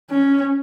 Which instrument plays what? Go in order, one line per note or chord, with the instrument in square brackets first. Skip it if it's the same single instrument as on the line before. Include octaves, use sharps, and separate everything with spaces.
[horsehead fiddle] C#4